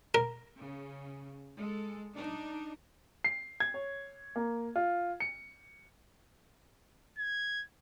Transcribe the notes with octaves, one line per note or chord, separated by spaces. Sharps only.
A#4
C#3
G#3 A4
D4 D#4
C7
G#6
C#5
A#3
F4
C#7
G#6